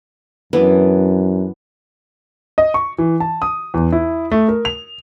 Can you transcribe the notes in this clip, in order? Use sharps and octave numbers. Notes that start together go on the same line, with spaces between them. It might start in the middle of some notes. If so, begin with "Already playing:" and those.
F#2 E3 B3 D4
D#5
C#6
E3
A5
D#6
E2
E4
A3
A#4
F7